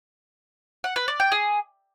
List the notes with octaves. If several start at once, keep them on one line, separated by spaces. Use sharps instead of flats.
F#5
B4
D5
G5
G#4